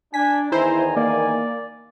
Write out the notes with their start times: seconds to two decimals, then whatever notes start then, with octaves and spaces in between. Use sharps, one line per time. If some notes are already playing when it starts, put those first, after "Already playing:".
0.14 D4 G#5 B6
0.52 E2 D#3 E4 C5 G#5 A#5
0.97 A#3 D5